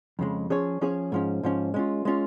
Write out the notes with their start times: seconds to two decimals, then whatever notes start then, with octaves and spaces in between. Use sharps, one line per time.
0.19 F2 C#3 G#3
0.50 F3 C#4 G#4 C#5
0.81 F3 C#4 G#4 C#5
1.12 G#2 F3 C#4
1.43 G#2 F3 C#4
1.74 G#3 C#4 F4
2.05 G#3 C#4 F4